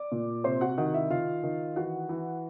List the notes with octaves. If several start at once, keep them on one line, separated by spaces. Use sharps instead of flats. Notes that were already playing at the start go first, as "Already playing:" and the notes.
Already playing: D5 D6
A#2
C3 C5 C6
F#4 F#5
D#3 F#4 F#5
E4 E5
D#3 F4 F5
D#3
E3 F#4 F#5
E3